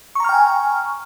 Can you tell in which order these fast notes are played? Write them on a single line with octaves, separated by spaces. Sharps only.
C#6 A#5 F6 G5 G#5